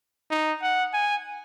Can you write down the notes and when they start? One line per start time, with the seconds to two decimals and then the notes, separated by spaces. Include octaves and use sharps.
0.31 D#4
0.62 F#5
0.94 G#5